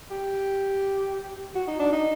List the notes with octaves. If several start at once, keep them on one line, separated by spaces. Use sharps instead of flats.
G4
F#4
D#4
D4
D#4